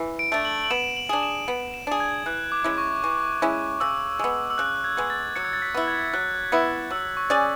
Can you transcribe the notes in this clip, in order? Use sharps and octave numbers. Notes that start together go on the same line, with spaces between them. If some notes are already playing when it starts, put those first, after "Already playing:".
Already playing: E3
D7
A3 D4
F#7
F#7
B3 E7
F#7
D4 G#4 F#7
E7
B3 F#7
E7
D4 G#4
G#6
E3 F#6
D6
G#3 C#4 E4
C#6
E3 C#6
G#3 C#4 E4
C#3 E6
G#3 B3
E6
C#3 F#6
G#6
G#3 B3
A6
F#3 C#7
G#6
A6
B6
B3 E4
G#6
F#3 F#6
B3 E4
F#3 E6
C#6
C#4 G#4 D5